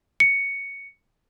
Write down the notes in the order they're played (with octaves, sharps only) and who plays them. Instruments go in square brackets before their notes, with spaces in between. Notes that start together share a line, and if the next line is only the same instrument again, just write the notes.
[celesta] C#7